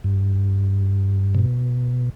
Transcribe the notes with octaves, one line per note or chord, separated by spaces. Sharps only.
G2
C3
B2